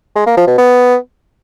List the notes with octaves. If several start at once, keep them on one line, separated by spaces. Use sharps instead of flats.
G#3
A#3
F3
B2
B3